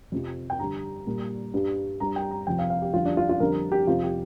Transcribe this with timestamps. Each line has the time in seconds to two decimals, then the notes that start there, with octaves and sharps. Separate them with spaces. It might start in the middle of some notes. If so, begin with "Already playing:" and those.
0.12 F2 C3 F3
0.50 G5
0.59 G2 D3 G3 A#5
1.07 A#2 G3
1.54 G2 G3
2.00 G2 G3 A#5
2.16 G5
2.31 A#5
2.47 F2 C3 F3 G5
2.59 F5
2.70 F5
2.82 G4
2.93 F2 D3 G3 F4
3.05 D4
3.17 F4
3.29 F4
3.40 F2 D3 G3 A#4
3.72 G4
3.87 F2 C3 F3 F4
4.03 G4